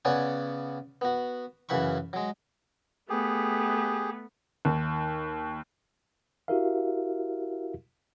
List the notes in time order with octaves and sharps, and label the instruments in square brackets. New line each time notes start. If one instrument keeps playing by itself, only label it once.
[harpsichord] C#3 B3 C#5 D5 F#5 G#5
B3 F#4
F#2 C#3 E3 F#5 B5 C#6
F#3 G#3
[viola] A3 B3 [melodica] G4 G#4
[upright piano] D#2
[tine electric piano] E4 F#4 G4 A#4 E5 F5